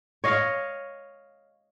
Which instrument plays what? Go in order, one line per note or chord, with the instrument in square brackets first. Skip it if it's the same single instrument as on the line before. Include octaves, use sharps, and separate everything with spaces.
[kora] C#5 D#5 F5